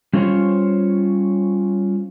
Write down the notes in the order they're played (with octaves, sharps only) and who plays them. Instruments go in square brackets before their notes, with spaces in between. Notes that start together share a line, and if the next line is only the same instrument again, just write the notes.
[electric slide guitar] G3 C#4 F4 A#4 C5 C#5